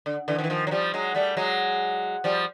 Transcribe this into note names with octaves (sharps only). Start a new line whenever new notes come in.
D3
D3 E3
D#3 F3
E3
D#3 F3
F#3
F3 G3
F#3 G#3
G3 A3
F#3 G#3
F3 G3